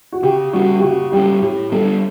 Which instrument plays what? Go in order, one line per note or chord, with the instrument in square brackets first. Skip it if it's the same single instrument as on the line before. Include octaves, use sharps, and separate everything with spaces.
[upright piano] F#4
[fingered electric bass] C#3 [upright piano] G4
[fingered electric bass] G3 C#4 [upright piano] F#4
[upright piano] G4
[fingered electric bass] C#3 [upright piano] F#4
[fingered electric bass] G3 C#4 [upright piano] G4
[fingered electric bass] A2 [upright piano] G4
[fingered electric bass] G3 B3 D4 [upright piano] A4